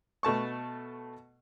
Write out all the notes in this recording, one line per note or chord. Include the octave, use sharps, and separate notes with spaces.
B2 A3 A5 C#6